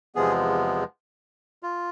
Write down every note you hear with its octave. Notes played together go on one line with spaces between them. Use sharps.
E2 C3 F3 G#3 B3 G#4
F4